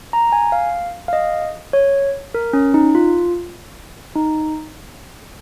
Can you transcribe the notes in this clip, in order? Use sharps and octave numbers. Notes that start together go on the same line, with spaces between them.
A#5
G#5
F5
F5
D#5
C#5
A#4
C#4
D#4
F4
D#4